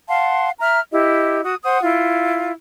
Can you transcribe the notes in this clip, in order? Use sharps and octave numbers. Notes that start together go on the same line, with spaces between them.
F5 F#5 A5 C6
E5 A#5 F6
E4 G4 D#5
F#4 D#6
C5 F#5 D#6
E4 F4